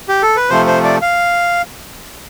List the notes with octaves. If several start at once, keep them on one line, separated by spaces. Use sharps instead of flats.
G4
A4
B4
C3 F3 A3 C5
C5
D5
F5